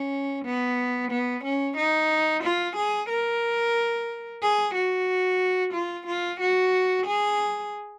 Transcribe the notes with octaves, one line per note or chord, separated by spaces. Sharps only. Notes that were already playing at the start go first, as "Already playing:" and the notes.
Already playing: C#4
B3
B3
C#4
D#4
F4
G#4
A#4
G#4
F#4
F4
F4
F#4
G#4